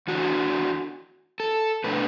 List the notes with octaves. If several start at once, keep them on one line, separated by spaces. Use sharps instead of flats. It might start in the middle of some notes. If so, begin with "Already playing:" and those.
E2 E3 D4 F#4
A4
B2 A3 D4 B4